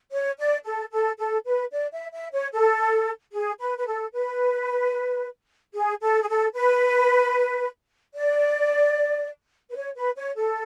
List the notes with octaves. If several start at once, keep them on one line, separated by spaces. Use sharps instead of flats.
C#5
D5
A4
A4
A4
B4
D5
E5
E5
C#5
A4
G#4
B4
B4
A4
B4
G#4
A4
G#4
A4
B4
D5
B4
C#5
B4
C#5
A4